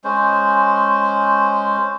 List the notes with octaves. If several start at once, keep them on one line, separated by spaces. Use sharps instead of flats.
G#3 C#4 C5